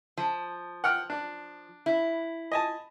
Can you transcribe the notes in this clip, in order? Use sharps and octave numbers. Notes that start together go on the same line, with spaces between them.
F3
F#5 G5 F6
D4
E4
D#5 G#5 A5